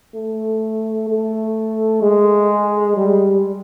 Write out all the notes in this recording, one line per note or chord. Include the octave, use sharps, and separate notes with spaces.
A3
A3
G#3
G3